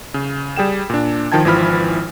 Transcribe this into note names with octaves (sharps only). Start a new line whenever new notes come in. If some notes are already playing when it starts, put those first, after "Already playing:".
C#3
G3 G#4 G5 E7
A#2 D4
D#3 F3 G5 A5 G#6
G#1 E3 F3 B5 F6